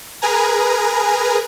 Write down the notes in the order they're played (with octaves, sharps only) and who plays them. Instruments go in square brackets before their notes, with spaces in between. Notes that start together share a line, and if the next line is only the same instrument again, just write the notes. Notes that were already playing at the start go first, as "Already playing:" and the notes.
[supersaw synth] G#4 A#4 B4 G#5 A#5